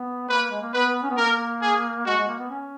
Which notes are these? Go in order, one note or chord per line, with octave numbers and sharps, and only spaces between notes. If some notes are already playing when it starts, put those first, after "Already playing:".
Already playing: B3
A#3 B4
G#3
A#3
B3 B4
C#4
B3
A#3 A#4
G#4
G#3 F#4
G#3
A#3
B3
C#4